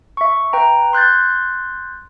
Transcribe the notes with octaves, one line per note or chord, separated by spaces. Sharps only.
E5 C#6
B4 G5 A#5
C6 F#6 G6 A6